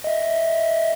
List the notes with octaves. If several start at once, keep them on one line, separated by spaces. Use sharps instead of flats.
D#5 E5